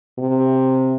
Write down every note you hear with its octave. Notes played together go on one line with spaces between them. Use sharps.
C3